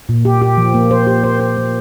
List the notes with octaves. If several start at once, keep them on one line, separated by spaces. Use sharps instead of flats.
A#2
G4
G4
F3
A#3
C5
G4
C5
C5
A#3